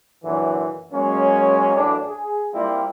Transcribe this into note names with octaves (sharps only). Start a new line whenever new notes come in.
F#2 A#2 D3 E3
F#3 G#3 A#3 C#4
A1 F#2 A2 D4
G#4
G3 A#3 C4 E4 F4